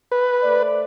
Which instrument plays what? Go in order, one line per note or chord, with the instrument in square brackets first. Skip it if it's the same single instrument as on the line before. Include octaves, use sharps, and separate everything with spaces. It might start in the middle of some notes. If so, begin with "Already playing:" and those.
[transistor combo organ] B4
[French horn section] A3 C5 D5